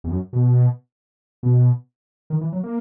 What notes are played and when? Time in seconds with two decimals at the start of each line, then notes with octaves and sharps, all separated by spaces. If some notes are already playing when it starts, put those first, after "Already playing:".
0.04 E2
0.11 F#2
0.33 B2
1.43 B2
2.30 D#3
2.41 E3
2.52 F#3
2.63 A#3